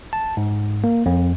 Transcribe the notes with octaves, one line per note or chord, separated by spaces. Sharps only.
A5
G#2
A#3
F2